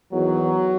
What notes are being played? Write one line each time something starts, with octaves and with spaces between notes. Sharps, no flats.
E2 D#3 F#3